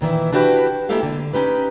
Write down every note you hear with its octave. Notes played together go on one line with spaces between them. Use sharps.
A#2 D#3 E3 E4
D4 E4 F#4 G4 B4
G#3 A#3 E4 G4 A4 F5
D3
C#4 D#4 G4 B4